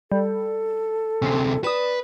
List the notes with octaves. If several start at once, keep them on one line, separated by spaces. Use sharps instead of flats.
G3 A4
D2 C3 C4 C#4
B4 D5 D#6 E7